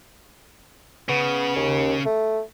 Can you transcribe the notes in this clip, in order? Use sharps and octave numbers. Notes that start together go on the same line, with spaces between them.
C#3 B3
D#2
A3